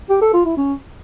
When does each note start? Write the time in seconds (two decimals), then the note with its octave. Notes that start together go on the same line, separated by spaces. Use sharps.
0.10 G4
0.22 A4
0.33 F4
0.45 E4
0.57 C#4